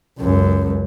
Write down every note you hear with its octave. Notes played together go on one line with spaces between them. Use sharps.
C#2 F#2